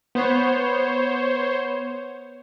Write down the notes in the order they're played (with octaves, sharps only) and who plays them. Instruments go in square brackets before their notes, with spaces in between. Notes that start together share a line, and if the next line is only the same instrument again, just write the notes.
[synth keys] B3 [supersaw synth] C5 C#5